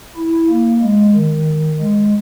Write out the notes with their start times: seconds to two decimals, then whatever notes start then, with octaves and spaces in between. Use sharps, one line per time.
0.16 E4
0.50 A#3
0.82 G#3
1.14 D#3
1.80 G#3